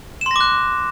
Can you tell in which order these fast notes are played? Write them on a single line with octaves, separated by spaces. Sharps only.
E7 C6 A#6 D6 F#6